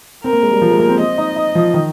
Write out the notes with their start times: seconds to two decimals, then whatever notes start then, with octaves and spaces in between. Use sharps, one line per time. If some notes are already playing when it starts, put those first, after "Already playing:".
0.24 C4 A#4
0.33 A#3
0.43 G#3
0.51 G3
0.62 F3
0.71 G#3
0.80 A#3
0.89 C4
0.99 C4 D#5
1.18 D#4
1.36 D#4
1.55 F3
1.74 D#3